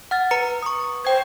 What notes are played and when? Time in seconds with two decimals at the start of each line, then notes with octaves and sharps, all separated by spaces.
0.11 F#5 F6 A6
0.31 B4 A#5 C#7
0.63 C#6 D#6
1.05 C5 G5 G#6